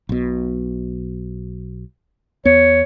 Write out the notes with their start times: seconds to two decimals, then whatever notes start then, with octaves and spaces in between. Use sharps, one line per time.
0.09 B1 B2
2.45 E2 B3 C#5